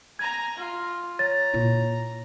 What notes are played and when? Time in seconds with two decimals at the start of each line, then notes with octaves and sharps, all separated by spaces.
0.19 G#5 A#5 G#6
0.56 F4
1.19 C#5 A#5 A6
1.53 A#2 E4